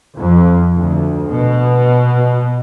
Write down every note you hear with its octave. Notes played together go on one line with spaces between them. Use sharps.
F2
D2
B2